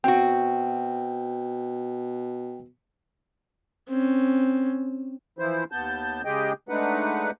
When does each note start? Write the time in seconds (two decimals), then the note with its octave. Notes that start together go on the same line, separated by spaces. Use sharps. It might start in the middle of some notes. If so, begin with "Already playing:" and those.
0.04 B2 C4 F#4 G5
3.89 C4 C#4
5.39 E3 F3 E4 C5
5.72 D#2 B3 A5 G6
6.25 C#3 G#3 G4 G#4 D#5 G5
6.69 G#3 A3 D4 D#4 B4 F#5